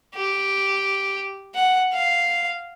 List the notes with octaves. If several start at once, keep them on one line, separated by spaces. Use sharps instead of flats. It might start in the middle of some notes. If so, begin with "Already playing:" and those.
G4
F#5
F5